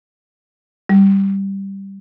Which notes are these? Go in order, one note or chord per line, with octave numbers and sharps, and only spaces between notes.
G3